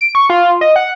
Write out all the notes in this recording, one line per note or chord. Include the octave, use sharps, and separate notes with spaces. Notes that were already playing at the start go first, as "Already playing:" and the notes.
D7
C#6
F4
D#5
F#5